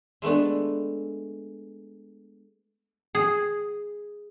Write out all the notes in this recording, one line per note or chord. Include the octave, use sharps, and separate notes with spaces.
G#3 A3 B3 D4
G#4